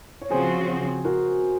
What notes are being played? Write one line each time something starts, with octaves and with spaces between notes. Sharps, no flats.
C#5
C#3 F3 C4 F#4 G#4 C5
F#4 A#4